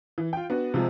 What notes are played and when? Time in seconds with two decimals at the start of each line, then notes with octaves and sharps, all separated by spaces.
0.18 E3
0.33 F4 G5
0.50 B3 D4 F#4
0.74 C3 F3 G#3